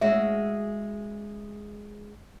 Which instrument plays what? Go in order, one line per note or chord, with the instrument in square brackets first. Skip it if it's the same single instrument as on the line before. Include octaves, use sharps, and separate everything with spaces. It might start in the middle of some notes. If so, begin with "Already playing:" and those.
[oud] G#3 C#4 F#4 [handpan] E5